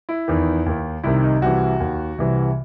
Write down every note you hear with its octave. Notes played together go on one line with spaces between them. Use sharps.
E4
E2 D#3
D#2 D#3
C2 C3 D#3 E4
D#4
C2 C3 E3 F#4
D#2 D#3
C2 C3 E3